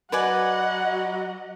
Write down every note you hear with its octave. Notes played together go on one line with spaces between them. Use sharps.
F#3 B4 D5 D#5 F#5 G#5